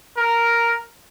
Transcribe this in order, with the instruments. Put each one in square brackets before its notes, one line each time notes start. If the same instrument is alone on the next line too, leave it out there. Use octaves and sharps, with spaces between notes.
[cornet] A#4